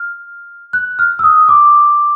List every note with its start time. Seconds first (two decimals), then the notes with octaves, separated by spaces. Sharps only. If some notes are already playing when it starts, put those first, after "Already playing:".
Already playing: F6
0.73 F#6
0.99 F6
1.19 E6
1.24 D#6
1.49 D6